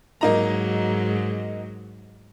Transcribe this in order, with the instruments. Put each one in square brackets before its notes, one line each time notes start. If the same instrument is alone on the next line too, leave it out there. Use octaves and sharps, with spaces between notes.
[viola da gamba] G#2 F#3 [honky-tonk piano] A#3 D#4 A#5